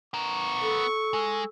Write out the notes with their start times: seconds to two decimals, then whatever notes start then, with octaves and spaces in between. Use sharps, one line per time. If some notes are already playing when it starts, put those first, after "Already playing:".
0.14 B3 A#4 C#6
0.60 A4
1.14 G#3